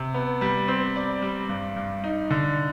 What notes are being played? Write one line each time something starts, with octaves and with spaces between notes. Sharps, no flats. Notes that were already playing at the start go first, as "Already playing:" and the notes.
Already playing: C3
B3
G3
C4
D5
G3
G2
G2
D#4
D3